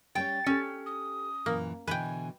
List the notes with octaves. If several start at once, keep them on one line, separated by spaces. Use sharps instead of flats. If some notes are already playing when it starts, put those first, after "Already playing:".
G3 C#4 C#5 G5 A6
C#4 G4 A4
D#6
F#2 A#2 E3 A#3
B2 D3 E3 B4 G5 G#5